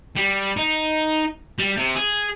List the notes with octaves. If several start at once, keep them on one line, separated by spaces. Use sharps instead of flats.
G3
D#4
G3
C3
G#4